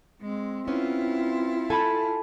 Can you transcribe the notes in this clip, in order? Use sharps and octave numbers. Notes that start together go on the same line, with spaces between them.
G#3 C4
B3 C#4 E4 F4
A4 G#5 A5 B5